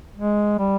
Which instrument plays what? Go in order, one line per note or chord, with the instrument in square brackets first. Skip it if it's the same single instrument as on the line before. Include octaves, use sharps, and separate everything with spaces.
[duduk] G#3
G3